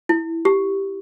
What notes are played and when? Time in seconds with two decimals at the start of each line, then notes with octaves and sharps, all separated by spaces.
0.09 E4
0.45 G4